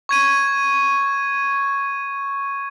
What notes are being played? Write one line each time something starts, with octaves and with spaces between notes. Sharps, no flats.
C#6 G#6 D#7